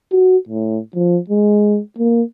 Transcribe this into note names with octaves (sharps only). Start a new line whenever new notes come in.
F#4
A2
F3
G#3
A#3